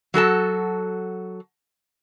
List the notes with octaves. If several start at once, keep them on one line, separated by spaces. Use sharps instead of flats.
F#3 F#4 A4 A5